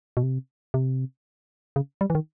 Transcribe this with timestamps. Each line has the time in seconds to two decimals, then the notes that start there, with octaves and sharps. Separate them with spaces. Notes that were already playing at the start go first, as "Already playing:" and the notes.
0.17 B2
0.23 C3
0.74 C3
1.76 C#3
2.01 G3
2.10 E3
2.15 D#3